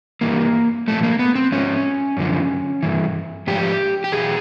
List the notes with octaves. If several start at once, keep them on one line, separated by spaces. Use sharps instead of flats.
G2 E3 A#3
A#2 F3 A3
A#3
B3
C4
G#2 F3 C#4
F#2 D3 F3
G2 E3
G#2 F3 G4
G4
E2 B2 F#3 G#4